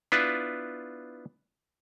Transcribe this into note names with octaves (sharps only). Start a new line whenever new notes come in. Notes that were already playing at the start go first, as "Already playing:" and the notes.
B3 D4 E4 F4 B4